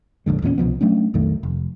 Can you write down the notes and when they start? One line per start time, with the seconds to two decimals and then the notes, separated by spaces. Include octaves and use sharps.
0.26 F1 A#1 D3 G#3
0.42 E2 A#2 C#3 C#4
0.58 C2 B2 F3 B3
0.81 F#3 A3 C#4 D4
1.14 B1 F2 D#3 A3
1.43 F1